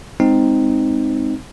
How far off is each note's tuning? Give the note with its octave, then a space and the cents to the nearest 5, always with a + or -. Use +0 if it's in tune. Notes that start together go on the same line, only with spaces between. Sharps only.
G#3 +0 C4 +0 D#4 +0